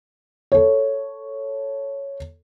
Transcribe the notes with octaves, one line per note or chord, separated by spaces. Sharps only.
A4 C#5